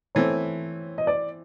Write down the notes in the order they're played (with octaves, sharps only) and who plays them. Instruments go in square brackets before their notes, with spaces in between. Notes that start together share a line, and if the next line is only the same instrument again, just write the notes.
[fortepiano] E3 A3 C4 [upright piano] C#5
[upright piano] D#5
D5